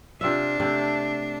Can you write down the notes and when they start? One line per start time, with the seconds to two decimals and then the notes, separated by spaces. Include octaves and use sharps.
0.21 C3 D4 F4 E5
0.60 C3 A3